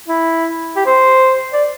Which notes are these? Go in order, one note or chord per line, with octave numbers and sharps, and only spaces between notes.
E4
G4
C5
D5